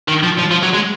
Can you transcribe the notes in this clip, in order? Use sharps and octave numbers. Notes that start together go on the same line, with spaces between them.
D#3
F3
F3
F3
F#3
G#3